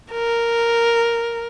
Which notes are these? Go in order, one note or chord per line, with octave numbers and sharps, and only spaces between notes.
A#4